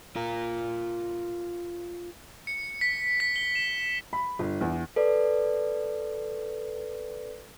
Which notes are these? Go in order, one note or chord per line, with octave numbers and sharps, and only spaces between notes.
F4 A#4
C#7
B6
B6
G7
E7
B5
G1
E2
A4 B4 D5